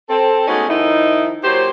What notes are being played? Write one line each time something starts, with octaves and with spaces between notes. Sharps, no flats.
C4 A4
G#3 A3 B3 C#4 D#4 F#4
D#3 F3 D#4 E4
A#2 F#3 G4 C5